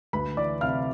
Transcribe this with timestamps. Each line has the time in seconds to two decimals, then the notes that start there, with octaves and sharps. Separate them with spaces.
0.13 D2 B4 B5
0.37 E3 D5 D6
0.61 C3 F5 F6